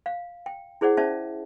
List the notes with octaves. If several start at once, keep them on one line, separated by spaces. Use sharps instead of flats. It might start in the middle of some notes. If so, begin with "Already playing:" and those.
F5
G5
E4 G#4 C5 D5 F#5
C#4 C5 D5 E5 A5